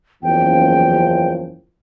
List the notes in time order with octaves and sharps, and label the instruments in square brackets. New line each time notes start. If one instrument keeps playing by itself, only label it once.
[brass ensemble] F#1 E2 F3 [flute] G5